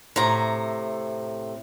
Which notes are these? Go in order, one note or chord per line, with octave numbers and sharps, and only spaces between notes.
A2 C3 A#5